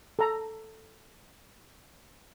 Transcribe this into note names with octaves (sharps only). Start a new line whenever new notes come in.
A4 A#5